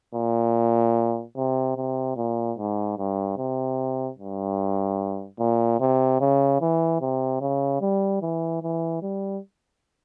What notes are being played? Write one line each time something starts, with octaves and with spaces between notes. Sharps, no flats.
A#2
C3
C3
A#2
G#2
G2
C3
G2
A#2
C3
C#3
E3
C3
C#3
G3
E3
E3
G3